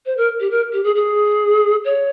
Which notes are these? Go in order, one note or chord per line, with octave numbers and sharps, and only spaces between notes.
C5
A#4
G4
A#4
G4
G#4
G#4
C#5